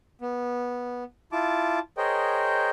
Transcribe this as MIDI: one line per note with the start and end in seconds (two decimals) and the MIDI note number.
0.21 1.04 59
1.32 1.79 64
1.32 1.79 65
1.32 1.79 81
1.32 1.79 86
1.97 2.70 68
1.97 2.70 70
1.97 2.70 72
1.97 2.70 73
1.97 2.70 75
1.97 2.70 79